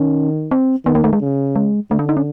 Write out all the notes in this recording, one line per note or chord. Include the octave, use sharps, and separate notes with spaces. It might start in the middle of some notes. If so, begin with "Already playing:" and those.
Already playing: D#3 C#4
C4
D#3 B3
A#3
A3
G#3
C#3
G#3
D3 A3
D4
D#4
C#4